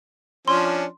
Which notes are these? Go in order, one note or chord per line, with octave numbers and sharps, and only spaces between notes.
F3 C#4 D4 C6